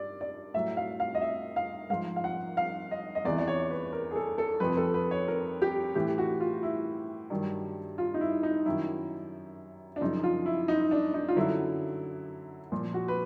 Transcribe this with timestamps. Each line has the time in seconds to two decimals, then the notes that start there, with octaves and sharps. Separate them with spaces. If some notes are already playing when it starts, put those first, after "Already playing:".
Already playing: G2 D5
0.21 D5
0.54 A2 F#3 E5
0.77 F5
1.00 F5
1.15 D#5
1.21 E5
1.56 F5
1.90 G#2 F3 F5
2.16 F5
2.24 F#5
2.57 F5
2.91 D#5
3.15 D#5
3.25 E2 C3 E3 D5
3.39 D5
3.48 C#5
3.70 B4
3.93 A#4
4.11 G#4
4.16 A4
4.38 A4
4.60 F2 C3 F3 B4
4.77 A4
4.94 B4
5.11 C#5
5.28 A#4
5.62 G4
5.95 A2 E3 G4
6.18 F#4
6.40 F4
6.63 E4
7.30 G2 D#3 F#3
7.98 F4
8.14 D#4
8.21 E4
8.43 D#4
8.66 F#2 D#3 F#3 E4
9.96 D4
10.01 F#2 C#3 F3 D#4
10.24 F4
10.46 E4
10.68 D#4
10.91 D4
11.14 D#4
11.28 F4
11.36 F#2 D3 F#3 E4
12.72 A#2 F3
12.94 F#4
13.08 B4